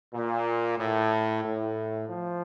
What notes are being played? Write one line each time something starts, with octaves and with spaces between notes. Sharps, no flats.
A#2
A2
A2
F3